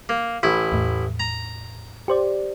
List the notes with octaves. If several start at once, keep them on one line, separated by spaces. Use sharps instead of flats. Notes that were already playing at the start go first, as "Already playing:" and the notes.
A#3
A1 E4
E2 A2
A#5
G4 C5 D5